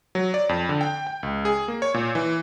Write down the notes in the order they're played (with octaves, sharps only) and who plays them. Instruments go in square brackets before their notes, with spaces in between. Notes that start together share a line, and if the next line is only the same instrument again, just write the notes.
[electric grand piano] F#3
D5
F2
D3
G5
G5
C#2
G#4
A#3
C#5
A#2
E3